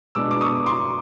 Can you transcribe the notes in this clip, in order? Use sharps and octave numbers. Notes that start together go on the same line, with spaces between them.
B2 G#3 B3 D4 D6 E6
D6
C#6 D#6
C6 D6